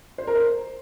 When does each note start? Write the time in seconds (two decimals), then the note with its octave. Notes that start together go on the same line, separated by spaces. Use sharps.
0.18 C5
0.27 A#4
0.36 C5